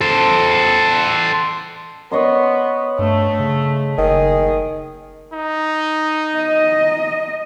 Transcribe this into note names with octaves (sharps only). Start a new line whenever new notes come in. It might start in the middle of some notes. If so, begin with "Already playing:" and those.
A4 C5
B3 C#5 D#5 C6
G2 A3
C#3
F#1 D#3 G#4
D#4
D#5